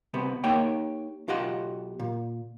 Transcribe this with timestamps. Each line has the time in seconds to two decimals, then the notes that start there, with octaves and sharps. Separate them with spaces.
0.14 C2 C3 B3
0.44 A#3 D#4 G4 C#5 F#5 G5
1.28 B1 F4 G4 D#5 F#5
1.99 A#2